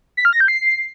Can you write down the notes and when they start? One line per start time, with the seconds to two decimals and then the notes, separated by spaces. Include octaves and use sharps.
0.17 B6
0.25 F6
0.33 A#6
0.40 G6
0.48 C7